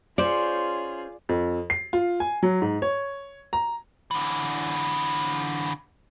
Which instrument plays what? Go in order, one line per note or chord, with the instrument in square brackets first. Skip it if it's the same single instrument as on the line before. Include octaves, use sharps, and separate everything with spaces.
[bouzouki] C#4 C5 [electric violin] F4 G#4 [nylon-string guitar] D5
[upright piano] F2
C7
F4
G#5
F#3
G#2
C#5
A#5
[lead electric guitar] D3 E3